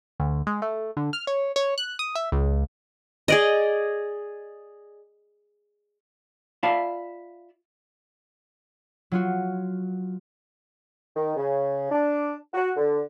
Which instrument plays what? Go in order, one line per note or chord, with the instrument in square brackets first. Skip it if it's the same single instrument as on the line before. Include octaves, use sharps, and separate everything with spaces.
[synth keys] D2
G#3
A3
D3
F6
C#5
C#5
F#6
D#6
E5
C#2
[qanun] G#4 D5 D#5
[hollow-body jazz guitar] F4 D5 E5 F5 A5 B5
[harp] F#3 F4 F#4
[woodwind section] D#3
C#3
D4
F#4
D3